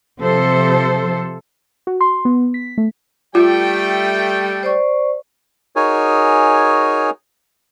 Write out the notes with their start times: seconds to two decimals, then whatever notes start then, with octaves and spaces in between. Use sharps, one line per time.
0.20 C3 F3 A4 C5
1.87 F#4
2.01 C6
2.25 B3
2.54 B6
2.78 A3
3.35 G3 A3 F4 G5
4.63 C5 D5 C#6
5.76 D#4 F#4 G#4 A#4 C#5 G#5